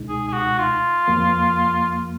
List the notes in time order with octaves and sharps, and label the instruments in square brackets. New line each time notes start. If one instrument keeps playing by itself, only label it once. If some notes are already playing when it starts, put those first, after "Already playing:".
Already playing: [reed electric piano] C#2 B2 G#3 D#4
[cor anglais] G#4
G#4
F#4
F4
[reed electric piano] F2 F3 A#3